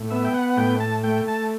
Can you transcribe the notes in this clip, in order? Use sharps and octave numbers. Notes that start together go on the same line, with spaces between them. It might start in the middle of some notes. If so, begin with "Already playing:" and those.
Already playing: A2
B3 E5
G5
F#5
F#5
A2 G5
A5
A3 G5
A5